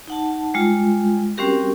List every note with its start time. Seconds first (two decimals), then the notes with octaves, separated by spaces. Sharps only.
0.08 D#4 F#5 A5
0.54 G3 G#3 F4
1.38 G3 C4 C#4 F#4 G4 A#4